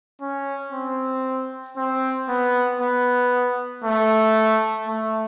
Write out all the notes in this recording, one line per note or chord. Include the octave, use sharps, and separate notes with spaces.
C#4
C4
C4
B3
B3
A3
A3